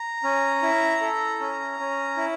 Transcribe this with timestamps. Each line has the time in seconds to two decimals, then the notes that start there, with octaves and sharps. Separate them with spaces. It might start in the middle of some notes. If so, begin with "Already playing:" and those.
Already playing: A#5
0.24 C#4
0.62 E4
1.01 A4
1.41 C#4
1.79 C#4
2.17 E4